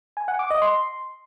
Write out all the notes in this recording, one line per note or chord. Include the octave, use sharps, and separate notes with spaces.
G#5
F#5
D6
D#5
C6